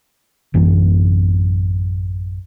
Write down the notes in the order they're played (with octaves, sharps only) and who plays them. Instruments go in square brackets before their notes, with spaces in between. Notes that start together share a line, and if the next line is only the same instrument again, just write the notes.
[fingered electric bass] A1 F#2 E3